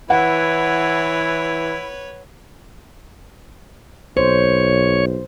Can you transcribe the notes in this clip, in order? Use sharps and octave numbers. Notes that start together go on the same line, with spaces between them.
E3 E4 B4 C#5 F#5
B1 C5 C#5